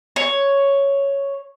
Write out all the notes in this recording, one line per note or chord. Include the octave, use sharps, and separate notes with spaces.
C#5